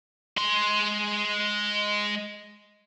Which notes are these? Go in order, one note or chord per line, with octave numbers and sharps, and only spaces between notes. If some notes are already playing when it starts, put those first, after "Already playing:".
G#3 C6